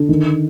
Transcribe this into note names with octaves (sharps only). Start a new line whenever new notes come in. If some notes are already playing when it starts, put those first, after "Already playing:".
Already playing: D3
D#3